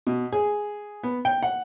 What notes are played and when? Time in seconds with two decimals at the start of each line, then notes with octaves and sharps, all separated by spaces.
0.07 B2
0.32 G#4
1.03 B3
1.25 G5
1.43 F#5